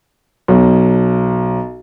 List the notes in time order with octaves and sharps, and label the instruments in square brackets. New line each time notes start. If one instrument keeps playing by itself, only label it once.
[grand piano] B1